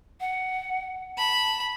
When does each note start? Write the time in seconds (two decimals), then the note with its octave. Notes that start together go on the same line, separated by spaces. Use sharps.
0.20 F#5
1.18 A5 B5